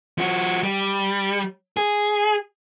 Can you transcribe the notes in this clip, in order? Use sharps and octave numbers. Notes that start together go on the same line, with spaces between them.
F3 F#4
G3
G#4